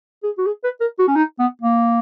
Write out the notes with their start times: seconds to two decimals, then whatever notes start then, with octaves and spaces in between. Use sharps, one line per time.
0.23 G#4
0.38 F#4
0.46 G#4
0.64 B4
0.81 A#4
0.99 F#4
1.08 C#4
1.16 D#4
1.39 B3
1.62 A#3